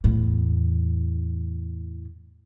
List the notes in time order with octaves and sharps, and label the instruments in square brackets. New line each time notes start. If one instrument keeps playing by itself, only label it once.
[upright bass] E2 A2